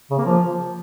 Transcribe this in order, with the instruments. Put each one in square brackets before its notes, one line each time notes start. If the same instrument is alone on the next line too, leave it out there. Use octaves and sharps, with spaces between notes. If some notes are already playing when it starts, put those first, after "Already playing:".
[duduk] C#3
A#3
F3